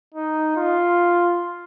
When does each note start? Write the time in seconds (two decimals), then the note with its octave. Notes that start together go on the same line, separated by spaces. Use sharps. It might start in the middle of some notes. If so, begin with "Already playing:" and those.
0.14 D#4
0.56 F4